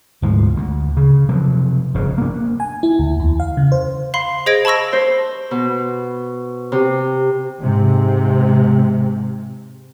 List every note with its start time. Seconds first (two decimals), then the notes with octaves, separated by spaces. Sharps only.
0.22 D2 G#2 C3 F3
0.56 D2
0.97 C#3
1.28 C3 F3 F#3
1.95 F1 G2 C#3
2.18 A#3 D4
2.60 G#5
2.83 E4
2.99 D2
3.20 E2
3.40 F5
3.57 C#3
3.72 C5
4.14 F5 B5 C6 C7
4.46 G#4 C5 D#5 G#6 A#6 D7
4.65 A5 B5 C#6 E6 A#6
4.93 C5
5.51 B2
6.72 C3
7.60 G#2 C3